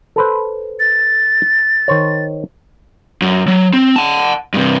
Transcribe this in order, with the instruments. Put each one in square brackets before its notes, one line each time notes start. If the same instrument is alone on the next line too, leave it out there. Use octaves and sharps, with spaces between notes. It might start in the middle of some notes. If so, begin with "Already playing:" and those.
[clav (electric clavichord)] A4 B4 C5
[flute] A6
[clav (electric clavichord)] D#3 C5 C#5
[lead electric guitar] F#2
F#3
C4
F#5 A5
G2 C3